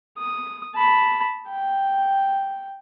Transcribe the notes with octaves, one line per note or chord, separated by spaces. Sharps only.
D#6
A5 B5
G5